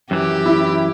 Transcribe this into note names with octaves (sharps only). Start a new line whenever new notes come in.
F#2 E3 G4
E4